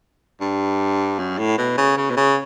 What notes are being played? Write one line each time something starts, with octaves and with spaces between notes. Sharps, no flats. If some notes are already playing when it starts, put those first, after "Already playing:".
G2
F#2
A2
B2
C#3
C#3
B2
C#3